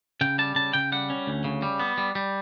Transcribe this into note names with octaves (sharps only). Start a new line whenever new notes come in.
C#3 G5
G3 A5
C#3 A5
C#3 G5
G3 F#5
C#4
D2
C#3
G3
B3
G3
G3